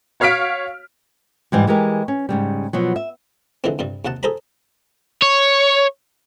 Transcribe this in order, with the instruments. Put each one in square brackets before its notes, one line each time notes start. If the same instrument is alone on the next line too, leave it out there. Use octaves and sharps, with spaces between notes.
[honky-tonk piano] F#4 C#5 F5 F6 B6 D7
[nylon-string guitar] G#2 E3 G3
E3 G#3 G4 A#4
C#4
G#2 C#3 G3
B2 F3 F#3
E5
[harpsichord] D3 E3 G#3 C4
G2 C3 G3
D#2 C3 F#5 A5
G#4 A4 C5 A#5 B5
[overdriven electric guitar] C#5